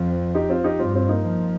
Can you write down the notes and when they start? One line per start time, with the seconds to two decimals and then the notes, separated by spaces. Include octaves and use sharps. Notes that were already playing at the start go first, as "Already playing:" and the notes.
Already playing: F2 C4 F4
0.35 D#4 G4
0.49 C4 F4
0.64 D#4 G4
0.79 G2 C4 F4
0.95 C4 F4
1.09 A#3 D#4
1.25 F3